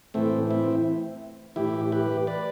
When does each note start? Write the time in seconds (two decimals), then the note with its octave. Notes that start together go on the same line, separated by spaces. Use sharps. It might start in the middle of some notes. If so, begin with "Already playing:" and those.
0.14 A2 E3 A3 C4
0.50 C4 E4
1.56 A2 E3 E4 G4
1.92 G4 B4
2.27 B4 D5